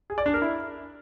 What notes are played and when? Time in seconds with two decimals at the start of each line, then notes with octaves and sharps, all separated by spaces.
0.10 G#4
0.18 D5
0.26 D4
0.34 A#4
0.42 E4